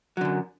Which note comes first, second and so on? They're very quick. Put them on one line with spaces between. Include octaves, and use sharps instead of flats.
F#3 D3 F#2